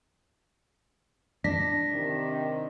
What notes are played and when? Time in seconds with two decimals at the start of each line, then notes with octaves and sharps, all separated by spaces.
1.44 D4 A#6 B6
1.91 C3 D#3